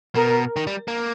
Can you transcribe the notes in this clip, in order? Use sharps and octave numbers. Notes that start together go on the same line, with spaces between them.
B2 A#4
D#3
G3
A#3